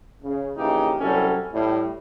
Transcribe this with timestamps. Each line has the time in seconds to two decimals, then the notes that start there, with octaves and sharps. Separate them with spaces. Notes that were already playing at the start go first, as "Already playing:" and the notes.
0.23 C#3
0.56 A#1 C#3 E3 D#4 G4
0.99 C2 F#3 G3 C#4 A4
1.52 A2 G3